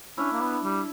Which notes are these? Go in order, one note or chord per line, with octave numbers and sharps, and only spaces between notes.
C#4 D4 E4
A#3
B3
G3